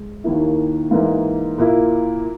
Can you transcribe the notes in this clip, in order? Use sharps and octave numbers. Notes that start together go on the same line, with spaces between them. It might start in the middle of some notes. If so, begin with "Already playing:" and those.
Already playing: G#3
D#2 D#3 A#3 E4
G#2 E3 A#3
A#2 A#3 E4